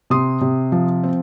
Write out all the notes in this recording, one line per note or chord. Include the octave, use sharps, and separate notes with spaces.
C3 C6 D#6
C3
F3
C4